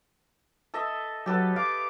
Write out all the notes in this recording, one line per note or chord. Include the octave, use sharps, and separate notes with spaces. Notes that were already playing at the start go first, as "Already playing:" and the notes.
A4 D#5 E5
F#3 G4 A4 B4
F5 D6